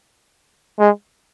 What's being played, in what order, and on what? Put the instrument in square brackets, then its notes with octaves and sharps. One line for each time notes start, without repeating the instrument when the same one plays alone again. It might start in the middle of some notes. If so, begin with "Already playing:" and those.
[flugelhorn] G#3